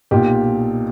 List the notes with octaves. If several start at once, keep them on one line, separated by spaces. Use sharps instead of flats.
B1 A#2 G4